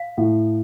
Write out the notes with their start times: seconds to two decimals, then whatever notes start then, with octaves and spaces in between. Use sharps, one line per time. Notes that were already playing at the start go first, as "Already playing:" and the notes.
Already playing: F5
0.18 A2